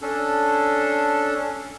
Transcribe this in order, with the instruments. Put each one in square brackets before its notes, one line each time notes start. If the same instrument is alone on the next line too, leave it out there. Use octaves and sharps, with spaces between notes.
[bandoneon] C#4 D4 A4